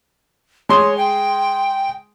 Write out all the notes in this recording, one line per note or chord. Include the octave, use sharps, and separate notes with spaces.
G#3 C#5 C6 D#6
G5